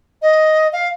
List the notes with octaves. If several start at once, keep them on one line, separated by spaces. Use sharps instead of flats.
D#5
F5